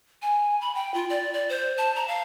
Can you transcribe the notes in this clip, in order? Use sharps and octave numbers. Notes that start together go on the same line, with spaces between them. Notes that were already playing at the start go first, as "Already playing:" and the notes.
G#5
B5
G5
F4
D5
D5
C5
A5
A#5
F5